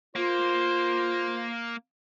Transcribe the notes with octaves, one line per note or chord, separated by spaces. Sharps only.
A#3 F4 C5